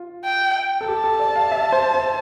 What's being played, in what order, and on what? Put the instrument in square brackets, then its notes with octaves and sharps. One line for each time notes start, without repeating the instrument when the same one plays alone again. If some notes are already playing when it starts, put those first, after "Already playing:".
Already playing: [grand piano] F4
[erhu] G5
[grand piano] A4
[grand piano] G4 [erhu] A5
[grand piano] A4
D5
F5
E5
C5
C5